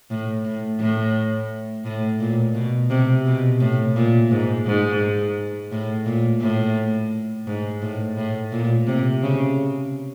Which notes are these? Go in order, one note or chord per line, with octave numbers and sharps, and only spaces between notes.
A2
A2
A2
A2
A#2
B2
C3
B2
A2
A#2
G#2
G#2
A2
A#2
A2
G#2
A2
A2
A#2
C3
C#3